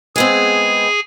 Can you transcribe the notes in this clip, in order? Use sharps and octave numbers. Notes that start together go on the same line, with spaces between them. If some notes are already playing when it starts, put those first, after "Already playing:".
G#3 B3 C4 G#4 G#5